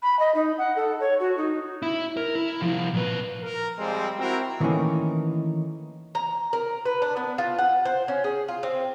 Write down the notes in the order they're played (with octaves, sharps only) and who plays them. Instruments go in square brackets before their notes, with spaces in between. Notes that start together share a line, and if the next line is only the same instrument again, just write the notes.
[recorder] B5
D#5
D#4
F#5
A4
C#5
F#4
D#4
[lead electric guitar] E4
A#4
E4
C2 F3
A#2 B4
[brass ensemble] A#4
F3 G3 G#3 C4
C4 E4 F#4 A#4
[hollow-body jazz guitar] D#3 E3 A3 A#3 C#4 D#4
[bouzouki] A#5
A#4
B4
D4
B3
F4
F#5
C5
C#4
G#4
F4
C4